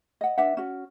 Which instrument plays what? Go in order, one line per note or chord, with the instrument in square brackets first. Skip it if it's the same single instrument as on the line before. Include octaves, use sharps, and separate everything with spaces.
[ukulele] D#5 F#5
D4 B4 E5 F#5
C#4 F#4